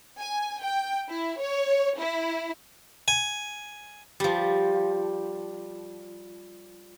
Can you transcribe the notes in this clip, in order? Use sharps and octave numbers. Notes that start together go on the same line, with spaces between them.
G#5
G5
E4
C#5
E4
G#5
F3 G3